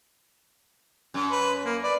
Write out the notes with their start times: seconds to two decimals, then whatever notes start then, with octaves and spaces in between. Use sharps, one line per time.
1.14 F#2
1.31 B4
1.65 A#3
1.84 B4 D5